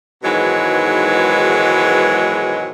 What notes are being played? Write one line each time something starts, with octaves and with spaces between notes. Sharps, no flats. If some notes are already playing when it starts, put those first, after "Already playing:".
G#2 B2 D#3 E3 F#3 G#3